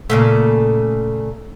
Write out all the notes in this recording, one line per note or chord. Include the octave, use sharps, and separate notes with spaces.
A#2 C#3 A3